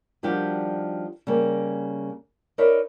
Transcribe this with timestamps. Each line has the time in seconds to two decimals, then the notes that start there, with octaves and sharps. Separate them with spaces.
0.23 D#3 F3 G3 D4 F#4 G4
1.27 C#3 G3 A#3
2.58 D#4 A#4 B4 C#5 D5 E5